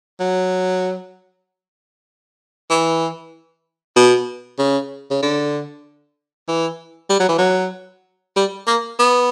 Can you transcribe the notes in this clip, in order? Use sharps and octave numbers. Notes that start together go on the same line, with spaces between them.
F#3
E3
B2
C#3
C#3
D3
E3
G3
F#3
E3
F#3
G3
A#3
B3